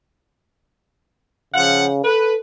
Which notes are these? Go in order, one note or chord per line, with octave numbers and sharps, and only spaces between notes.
C#3 F3 F5 F#5
A4 B4